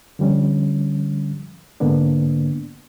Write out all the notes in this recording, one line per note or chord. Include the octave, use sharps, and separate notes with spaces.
D3 F3 G3 C#4
G#2 D3 A#3 B3 D4